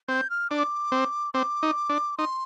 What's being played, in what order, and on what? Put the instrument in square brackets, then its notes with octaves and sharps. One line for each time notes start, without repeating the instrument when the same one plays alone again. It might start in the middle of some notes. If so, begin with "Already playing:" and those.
[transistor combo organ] C4 [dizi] G6
[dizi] F6
[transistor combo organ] D4 [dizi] D6
[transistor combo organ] C4
[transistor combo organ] C4 [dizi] D6
[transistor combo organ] D#4
D4
[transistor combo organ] D#4 [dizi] C6